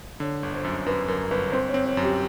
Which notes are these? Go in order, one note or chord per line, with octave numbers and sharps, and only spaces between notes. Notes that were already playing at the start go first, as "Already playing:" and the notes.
D3 C#5
G1
C5
F#2
F#2 B4
F#2 A#4
G1 B4
C4 C5
C#5
C4
C#5
F#2
G4